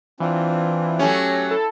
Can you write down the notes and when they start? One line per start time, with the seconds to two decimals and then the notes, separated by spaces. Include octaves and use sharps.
0.20 E3 C4 D4 F4
0.99 F#3 A3 C#4 G4 A4
1.51 E4 A4